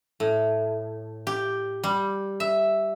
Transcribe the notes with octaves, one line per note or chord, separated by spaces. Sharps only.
A2
G4
G3
E5